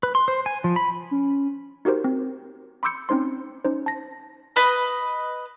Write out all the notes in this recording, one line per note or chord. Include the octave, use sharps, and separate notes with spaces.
B4
C6
C5
G#5
F3
B5
C#4
D#4 F#4 G4 A#4 C5
C4
B5 C6 D6 E6 G6 C#7
C4 C#4 D#4 C5 C6
C#4 D#4 C5
A5 A#6
B4 D#5